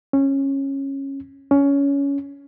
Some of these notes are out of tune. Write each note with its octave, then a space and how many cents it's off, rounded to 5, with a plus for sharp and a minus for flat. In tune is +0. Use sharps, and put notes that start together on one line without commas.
C#4 -20
C#4 +15